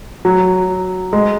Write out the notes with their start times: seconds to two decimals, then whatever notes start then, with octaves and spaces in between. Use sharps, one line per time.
0.25 F#3
1.13 G#3